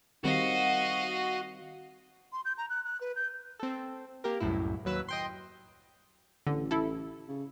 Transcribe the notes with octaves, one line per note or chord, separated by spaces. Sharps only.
D#3 G3 C4 F#4 D#5 F5
C6
G6
A#5
F#6
F#6
B4
G6
C4 A4
A#3 G4 A#4
C2 F#2 A2 E4
D#2 F#3 B4 E6
D#5 G5 C6
A1 D3
E4 A4
C#3